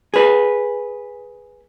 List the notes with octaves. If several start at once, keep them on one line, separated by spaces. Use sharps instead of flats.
G#4 B4